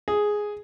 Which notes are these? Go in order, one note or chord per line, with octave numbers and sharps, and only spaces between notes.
G#4